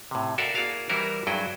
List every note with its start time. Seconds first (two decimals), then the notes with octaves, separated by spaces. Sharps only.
0.11 A2 C3
0.38 F#4 A4 A#4 D5 E5 F5
0.55 A#3 E4 F#4 G#4 D5 F5
0.89 E3 G3 E4 F#4 A#4 C5
1.27 G2 F#3 E4 F#4 G#4 G5